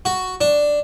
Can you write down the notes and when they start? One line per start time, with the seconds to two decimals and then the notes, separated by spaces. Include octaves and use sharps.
0.05 F#4
0.41 D4